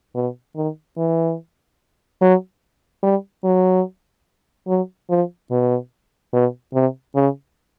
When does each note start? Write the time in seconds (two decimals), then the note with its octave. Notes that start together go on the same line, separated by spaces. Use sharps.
0.15 B2
0.56 D#3
0.97 E3
2.21 F#3
3.03 G3
3.44 F#3
4.67 F#3
5.10 F3
5.51 B2
6.33 B2
6.74 C3
7.15 C#3